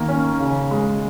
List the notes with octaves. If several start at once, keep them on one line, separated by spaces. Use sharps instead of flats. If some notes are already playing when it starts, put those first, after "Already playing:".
Already playing: D#3 A#3
C#4
C#3
G#3